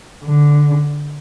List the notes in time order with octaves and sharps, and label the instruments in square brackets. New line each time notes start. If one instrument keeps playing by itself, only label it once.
[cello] D3